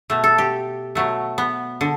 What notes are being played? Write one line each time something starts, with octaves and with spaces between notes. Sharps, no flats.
B2 A3
A4
G4
B2 F#3 A3
B3
D3